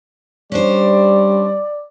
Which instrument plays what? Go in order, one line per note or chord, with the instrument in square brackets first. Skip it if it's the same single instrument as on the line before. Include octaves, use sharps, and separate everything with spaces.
[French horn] G3 [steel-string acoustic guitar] C#4 D4 C5 [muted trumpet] D5